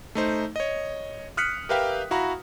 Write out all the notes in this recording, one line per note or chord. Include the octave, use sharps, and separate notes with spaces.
A3 D#4 C5
C#5 D#5
D#6 F6 F#6 B6 C#7
G4 A#4 B4 E5 F5 G5
E4 F#4 F5 A#5 B5